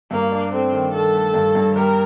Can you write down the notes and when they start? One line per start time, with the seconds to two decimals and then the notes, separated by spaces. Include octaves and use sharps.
0.11 G2 A#3
0.32 D4
0.52 A3 C4
0.73 D#3
0.93 D#3 A4
1.14 A3
1.34 G2
1.55 G2
1.75 G3 A#4